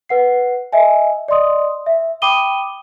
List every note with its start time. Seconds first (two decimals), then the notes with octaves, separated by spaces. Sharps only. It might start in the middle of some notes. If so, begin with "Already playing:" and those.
0.09 B4 F#5 C7
0.73 D#5 E5 G#5
1.28 D5 D#5 C6 D#6
1.86 E5
2.22 G5 B5 D6 D#6 D#7 G7